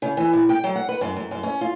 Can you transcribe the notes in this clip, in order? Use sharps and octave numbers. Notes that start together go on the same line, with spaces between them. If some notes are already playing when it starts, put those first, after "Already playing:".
C#3
E3
A#2
G5
F#3
F#5
B4
F#2
F#2
F#2
C#4
F4